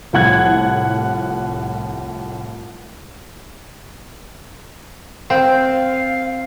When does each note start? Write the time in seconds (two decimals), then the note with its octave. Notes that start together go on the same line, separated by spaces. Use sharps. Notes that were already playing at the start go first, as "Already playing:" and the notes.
0.13 C2 A2 F3 F#5 F#6 G#6
5.30 C4 F5